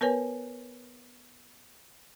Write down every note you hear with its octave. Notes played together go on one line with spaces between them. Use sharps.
B3 A#4 B4 C#5 G#5